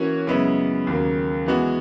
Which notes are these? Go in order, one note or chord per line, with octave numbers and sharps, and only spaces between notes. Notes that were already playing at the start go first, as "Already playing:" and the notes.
Already playing: E3 A#3 C#4 F#4 C#5
F#2 C#3 G#3 B3 E4
D#2 C#3 F#3 A#3
E3 G#3 B3 F#4